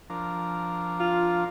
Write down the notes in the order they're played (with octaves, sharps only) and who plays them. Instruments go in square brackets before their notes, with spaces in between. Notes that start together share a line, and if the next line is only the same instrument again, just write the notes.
[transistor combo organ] F3 D4 A#4
[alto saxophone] F4